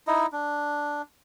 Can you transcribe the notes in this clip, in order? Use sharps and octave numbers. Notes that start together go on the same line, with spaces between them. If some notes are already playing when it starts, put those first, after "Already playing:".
D#4 E4 D#5
D4